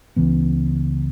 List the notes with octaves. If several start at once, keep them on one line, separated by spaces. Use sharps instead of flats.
C#2 C#3 E3 B3